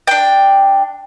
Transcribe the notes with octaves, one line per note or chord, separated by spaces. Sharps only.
D4 G5